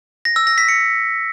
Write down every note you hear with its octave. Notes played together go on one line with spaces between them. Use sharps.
A#6
E6
A#6
B6
C#7